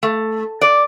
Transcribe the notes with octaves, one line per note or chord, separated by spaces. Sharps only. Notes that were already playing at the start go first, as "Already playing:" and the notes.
A3
D5